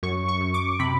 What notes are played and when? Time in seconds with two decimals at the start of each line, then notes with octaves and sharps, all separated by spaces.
0.03 F#2 C#6
0.28 C#6
0.41 F#2
0.54 D6
0.79 C3 B5